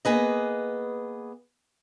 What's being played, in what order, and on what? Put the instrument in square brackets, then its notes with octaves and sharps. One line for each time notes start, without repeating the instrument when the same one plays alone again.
[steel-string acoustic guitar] A#3 B3 G#4 B4 D#5